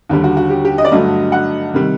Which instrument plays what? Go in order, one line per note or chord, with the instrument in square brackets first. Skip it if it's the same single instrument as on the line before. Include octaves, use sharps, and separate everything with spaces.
[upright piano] D#2 D3 G3
F#4
F#4
G4
G4
D#5
D5
G2 D3 F#3 A3 D#5
F#5
C3 D#3 G3